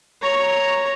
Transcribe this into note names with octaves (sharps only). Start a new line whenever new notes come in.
C#5 A#5